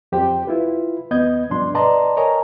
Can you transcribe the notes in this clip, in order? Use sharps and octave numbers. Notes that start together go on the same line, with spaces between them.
F2 G4 C5 G5
E4 F4 B4
D#2 B3 D#5 G6 G#6
G2 B2 F3 D4 C6
B4 D5 D#5 A5 A#5 C6
A#4 C#5 D#5 G#5 A#5